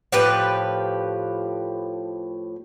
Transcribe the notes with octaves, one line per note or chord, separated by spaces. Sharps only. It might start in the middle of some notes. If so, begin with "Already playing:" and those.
A2 F3 G4 B4